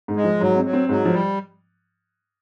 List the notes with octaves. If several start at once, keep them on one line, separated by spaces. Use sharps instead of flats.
G#2
G#3
F3
G#2 F#3
C4
F#3
C4
G#2 F#3
F3
G3